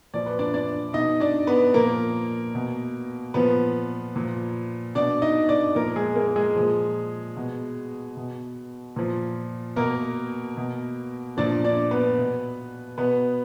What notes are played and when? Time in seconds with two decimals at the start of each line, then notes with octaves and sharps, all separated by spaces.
0.14 A#2 F3 D5
0.26 B4
0.39 D4 D5
0.54 D4 D5
0.93 B2 D#4 D#5
1.20 D4 D5
1.47 B3 B4
1.74 A#2 F3 A#3 A#4
2.55 B2
3.34 A#2 F3 B3 B4
4.16 A#2 F3
4.95 B2 D4 D5
5.22 D#4 D#5
5.49 D4 D5
5.75 A#2 F3 A#3 A#4
5.96 G#3 G#4
6.16 A#3 A#4
6.36 G#3 G#4
6.56 A#2 F3
7.37 B2
8.17 B2
8.96 A#2 F3
9.76 B2 A#3 A#4
10.57 B2
11.37 A#2 F3 D4 D5
11.64 D4 D5
11.91 B3 B4
12.18 B2
12.98 B2 B3 B4